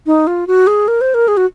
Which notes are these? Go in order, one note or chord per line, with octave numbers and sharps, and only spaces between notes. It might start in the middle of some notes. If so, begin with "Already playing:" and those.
D#4
F4
F#4
G#4
A#4
C5
A#4
G#4
F#4